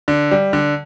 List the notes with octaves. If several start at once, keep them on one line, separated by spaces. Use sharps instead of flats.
D3
G3
D3